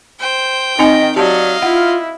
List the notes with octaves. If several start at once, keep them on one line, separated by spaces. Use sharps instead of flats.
C5 G5
D#3 C4 D#4 D#5 G#5
F#3 G4 D5 D#5 F5 A5
E4 F4 F#5